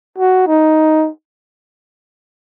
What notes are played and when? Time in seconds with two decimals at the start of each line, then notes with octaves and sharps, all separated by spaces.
0.18 F#4
0.47 D#4